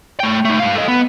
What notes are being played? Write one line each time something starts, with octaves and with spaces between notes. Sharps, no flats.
A3 G5
A3 D#4
G2 F5
A4 D#5
B3